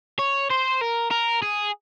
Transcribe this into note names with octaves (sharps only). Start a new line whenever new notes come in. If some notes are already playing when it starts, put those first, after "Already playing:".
C#5
C5
A#4
A#4
G#4